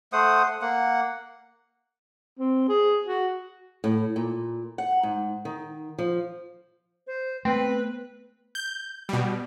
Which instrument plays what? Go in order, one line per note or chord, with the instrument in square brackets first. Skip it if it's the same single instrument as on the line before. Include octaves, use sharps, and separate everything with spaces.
[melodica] A3 C5 F#5 D#6
A#3 F#5
[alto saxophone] C4
G#4
F#4
[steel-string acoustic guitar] A2
A#2
F#5
G#2
D#3
F3
[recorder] C5
[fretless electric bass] A3 B3 [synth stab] C4 [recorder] B4
[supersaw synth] G6
B2 G3